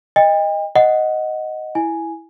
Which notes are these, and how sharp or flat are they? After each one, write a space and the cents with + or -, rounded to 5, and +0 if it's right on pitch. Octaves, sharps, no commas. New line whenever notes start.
D#5 +0 G5 +40
D#5 +0 F#5 +0
E4 +0 G#5 +0